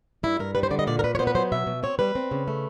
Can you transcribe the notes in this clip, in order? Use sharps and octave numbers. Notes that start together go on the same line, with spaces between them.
G2 E4
G2 A#4
G3 B4
C5
D3 D5
D#5
A#2 D5
A#4
A#2 B4
C#5
B3 C5
B4
F#3 C5
B2 E5
B2
C4 C#5
G3 B4
C4
C#3
A3